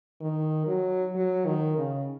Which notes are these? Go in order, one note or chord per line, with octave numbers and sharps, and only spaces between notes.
D#3
F#3
F#3
D#3
C#3